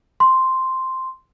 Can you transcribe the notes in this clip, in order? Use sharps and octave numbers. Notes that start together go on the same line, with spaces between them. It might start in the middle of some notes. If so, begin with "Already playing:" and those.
C6